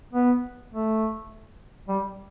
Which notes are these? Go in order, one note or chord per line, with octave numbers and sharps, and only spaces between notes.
B3
A3
G3